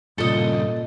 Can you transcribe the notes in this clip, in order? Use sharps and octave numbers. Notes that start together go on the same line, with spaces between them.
G2 A#2 C#3 F4 A4 D#5